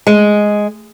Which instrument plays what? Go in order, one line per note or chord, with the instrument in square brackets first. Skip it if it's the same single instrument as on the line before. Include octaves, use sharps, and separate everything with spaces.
[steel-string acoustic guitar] G#3